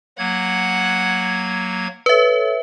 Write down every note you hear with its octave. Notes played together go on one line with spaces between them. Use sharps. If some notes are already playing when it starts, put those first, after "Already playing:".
F#3 A#3 F#5 G#6
A4 B4 C#5 E5